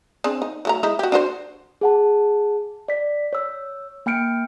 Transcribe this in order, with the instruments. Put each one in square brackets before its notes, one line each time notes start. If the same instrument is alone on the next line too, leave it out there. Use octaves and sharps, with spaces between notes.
[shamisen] C4 D4 G#4
D#4
F#3 A3 A#5
G#3 D#4 E4
F#4 G4
D4 F#4 C5
[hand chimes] G#4 F#5 A5
D5 B6
C#5 E6
A#3 G5 F6 C#7 D7